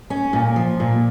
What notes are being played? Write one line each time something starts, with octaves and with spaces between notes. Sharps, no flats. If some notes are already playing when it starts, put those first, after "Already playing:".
C#4
A#2
F3
A#2